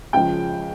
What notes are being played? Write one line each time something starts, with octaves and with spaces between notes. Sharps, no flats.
C#2 C#3 F3 G5